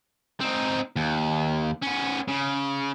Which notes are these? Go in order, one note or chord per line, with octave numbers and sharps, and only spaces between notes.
C4 D#4
D#2
B3 C#4
C#3